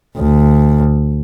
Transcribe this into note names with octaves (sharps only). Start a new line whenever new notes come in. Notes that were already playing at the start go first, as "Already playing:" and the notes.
D2